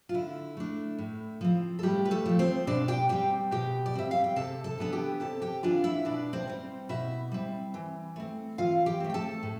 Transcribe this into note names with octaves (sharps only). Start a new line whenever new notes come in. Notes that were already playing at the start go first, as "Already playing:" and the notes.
F4
D3 E4
A3 D4
A2
F3 C4
A4
A2 G3 G4
B4
A3 A4
F3 C4
C4 C5
B2 D4 D5
G4 G5
G3 C4 G4 G5
B2 G4 G5
D5
G3 C4 E5
F5
G5
C3 A4 A5
A4 A5
E3 B3 D4 A5
G4 G5
C3 A4 A5
G4 G5
E3 B3 D4 F4 F5
E4 E5
B2 D4 D5
C4 C5
G3 C4
B2 E4 E5
G3 C4
E3
A3 C4
E3 F4 F5
G4 G5
A3 C4
G5
A4 A5
A2